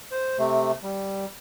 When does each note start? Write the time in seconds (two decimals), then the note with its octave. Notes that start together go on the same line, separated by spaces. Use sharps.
0.11 C5
0.38 C3 A3
0.83 G3